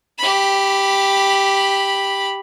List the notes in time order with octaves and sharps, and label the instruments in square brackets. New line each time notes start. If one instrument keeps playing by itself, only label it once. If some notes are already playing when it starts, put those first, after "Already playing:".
[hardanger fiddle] G4 B5